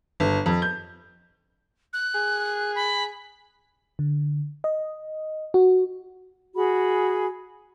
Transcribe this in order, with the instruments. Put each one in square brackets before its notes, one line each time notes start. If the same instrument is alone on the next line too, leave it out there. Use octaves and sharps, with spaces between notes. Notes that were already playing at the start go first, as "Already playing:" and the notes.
[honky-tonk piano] G1
F2
G6
[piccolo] F#6
[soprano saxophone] G#4
[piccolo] B5
[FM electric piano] D3
D#5
F#4
[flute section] F#4 G#4 B5